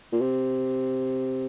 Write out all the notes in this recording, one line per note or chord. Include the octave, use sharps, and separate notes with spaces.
A#2
C3